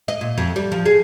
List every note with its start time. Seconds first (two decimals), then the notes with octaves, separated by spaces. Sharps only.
0.08 D#5
0.21 A#2
0.38 F2
0.56 G3
0.72 F3
0.86 G#4